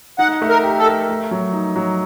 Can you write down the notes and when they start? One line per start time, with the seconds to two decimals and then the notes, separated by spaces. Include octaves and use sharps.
0.19 D#4 F#5
0.42 A3
0.49 A#4
0.63 G4
0.79 A4
0.86 A#4
1.09 A3
1.31 F#3
1.53 D#4
1.76 F#3